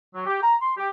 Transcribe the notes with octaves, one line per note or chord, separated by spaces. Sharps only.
F#3
G4
A#5
C6
G4